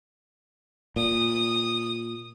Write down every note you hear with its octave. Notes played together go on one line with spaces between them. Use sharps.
A#2 D#6